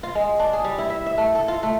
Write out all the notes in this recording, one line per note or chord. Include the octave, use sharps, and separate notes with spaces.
F4
G#3
D4
G#4
G3
E4
E5
E5
A3
A4
F4
A3